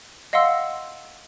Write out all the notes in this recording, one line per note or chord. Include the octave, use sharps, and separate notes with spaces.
D#5 F5 F#5 C6 E6